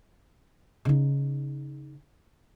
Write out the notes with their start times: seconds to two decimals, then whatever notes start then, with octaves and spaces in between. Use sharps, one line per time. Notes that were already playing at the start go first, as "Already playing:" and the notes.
0.85 C#3 D#4